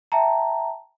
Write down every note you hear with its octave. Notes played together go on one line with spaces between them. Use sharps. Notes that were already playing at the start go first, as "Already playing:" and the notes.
E5 G5 A5 A#5